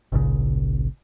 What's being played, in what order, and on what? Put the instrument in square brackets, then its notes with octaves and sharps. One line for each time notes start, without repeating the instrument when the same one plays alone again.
[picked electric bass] G#1 C#2 A#2 C#3